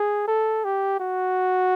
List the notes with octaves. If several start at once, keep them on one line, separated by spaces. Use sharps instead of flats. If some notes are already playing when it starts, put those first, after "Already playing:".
Already playing: G#4
A4
G4
F#4